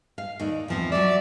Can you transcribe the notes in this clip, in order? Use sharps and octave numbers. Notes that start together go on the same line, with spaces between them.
F5
D#2 D#4 D5
E2 F3 C4
F#3 D5 E5